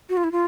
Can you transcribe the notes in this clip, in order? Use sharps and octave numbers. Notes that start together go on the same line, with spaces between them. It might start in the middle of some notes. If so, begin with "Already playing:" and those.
F#4
F4
E4
F4